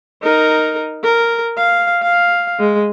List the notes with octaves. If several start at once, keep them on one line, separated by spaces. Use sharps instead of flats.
D#4 A#4
A#4
F5
F5
G#3